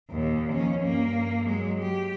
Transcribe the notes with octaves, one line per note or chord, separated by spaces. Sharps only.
D#2 A#2
F3 C#4
G2 A#3
F#3 G#3
G4